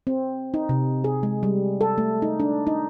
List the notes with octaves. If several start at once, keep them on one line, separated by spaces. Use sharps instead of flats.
C4
D#4
C3
G#4
G#3
G3
A4
A3
D#4
D4
D#4